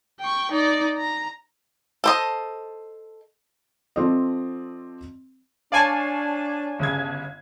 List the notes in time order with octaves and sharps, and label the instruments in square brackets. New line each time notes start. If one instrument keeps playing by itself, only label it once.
[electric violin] G5 C#6
D#4 D5
A#5
[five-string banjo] A4 C5 D#5
[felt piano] F3 C4 A4 D5 D#5
[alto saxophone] D4 [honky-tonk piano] C#5 F5 [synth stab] D5 G#5 A5
[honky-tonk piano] G1 C#3 G#6